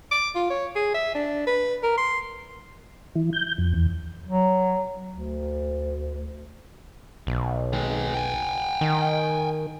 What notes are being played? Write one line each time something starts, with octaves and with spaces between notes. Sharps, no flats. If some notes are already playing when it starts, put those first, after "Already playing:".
D6
F4
C#5
G#4
E5
D4
B4
A#4
C6
E3
G6
F2
E2
F#3
D2
B1
D#3 G#3
G5 G#5
D#3